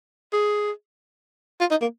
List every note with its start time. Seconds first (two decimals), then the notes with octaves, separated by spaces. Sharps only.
0.33 G#4
1.60 F4
1.71 D#4
1.82 A#3